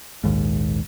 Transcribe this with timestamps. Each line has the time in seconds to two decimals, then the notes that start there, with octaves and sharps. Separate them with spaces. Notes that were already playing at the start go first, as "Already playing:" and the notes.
0.24 A#1 D#2 G#2